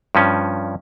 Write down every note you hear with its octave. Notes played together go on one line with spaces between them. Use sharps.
G2 F3 C#4